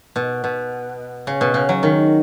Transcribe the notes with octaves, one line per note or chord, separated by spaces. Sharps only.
B2
B2
C#3
B2
C#3
F#3
D#3